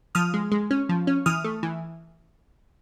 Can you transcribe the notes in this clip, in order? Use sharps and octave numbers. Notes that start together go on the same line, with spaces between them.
F3 D#6 F6
G#3
G#3
C#4
F3
C#4
E3 D#6 F6
A3
E3